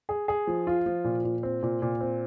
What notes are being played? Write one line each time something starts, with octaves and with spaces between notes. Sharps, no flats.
G#4
G#4
F3
F4
F3
A#2
A#2
C4
A#2
A#2
C4